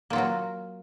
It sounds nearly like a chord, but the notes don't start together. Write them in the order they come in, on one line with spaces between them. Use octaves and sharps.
A#3 F4 F#3 F#4